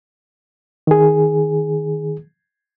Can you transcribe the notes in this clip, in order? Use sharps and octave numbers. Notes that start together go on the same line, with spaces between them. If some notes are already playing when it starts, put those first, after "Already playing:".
D#3 G#4